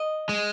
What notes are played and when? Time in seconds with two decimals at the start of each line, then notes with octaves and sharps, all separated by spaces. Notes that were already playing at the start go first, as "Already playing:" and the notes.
Already playing: D#5
0.29 G#3